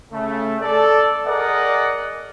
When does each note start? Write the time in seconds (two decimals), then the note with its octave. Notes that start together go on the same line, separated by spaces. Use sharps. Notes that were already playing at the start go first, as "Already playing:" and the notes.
0.11 C#3 A3
0.61 A4 D5
1.27 G#4 A#4 D5 D#5 F#5